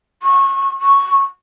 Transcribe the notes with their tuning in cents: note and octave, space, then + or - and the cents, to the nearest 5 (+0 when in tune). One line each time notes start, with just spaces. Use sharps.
C#6 -25
C#6 +0